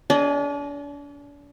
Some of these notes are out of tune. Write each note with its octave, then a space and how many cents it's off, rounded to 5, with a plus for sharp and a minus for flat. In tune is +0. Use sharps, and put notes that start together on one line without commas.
D4 -40 G#4 +0 D#5 -10